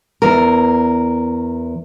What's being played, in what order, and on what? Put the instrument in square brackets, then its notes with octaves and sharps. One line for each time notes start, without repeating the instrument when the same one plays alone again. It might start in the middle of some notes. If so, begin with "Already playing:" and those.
[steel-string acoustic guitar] E2 A#4